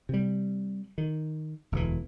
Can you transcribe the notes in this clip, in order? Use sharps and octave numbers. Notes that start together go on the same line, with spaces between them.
C3 G3
D#3
E1 D2 D3 E3